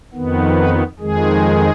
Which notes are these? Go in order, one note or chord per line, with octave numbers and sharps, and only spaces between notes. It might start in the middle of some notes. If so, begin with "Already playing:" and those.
F2 D#3 B3
B4
F2 D#3 G#3 G#4